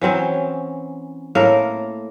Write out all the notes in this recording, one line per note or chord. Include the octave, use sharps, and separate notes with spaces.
E3 F#3 C4 C#4
A2 A#3 A4 A#4